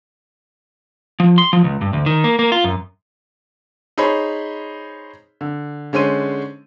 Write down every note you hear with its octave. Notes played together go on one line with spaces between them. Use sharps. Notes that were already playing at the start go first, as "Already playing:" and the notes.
F3
C6
F3
C#2
G2
D2
D#3
A#3
A#3
F4
F#2
D#4 G#4 C5 C#5 B5
D3
D3 G#3 C#4 C5 D#7